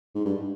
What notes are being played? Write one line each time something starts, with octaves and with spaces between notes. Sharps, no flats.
G#2
G2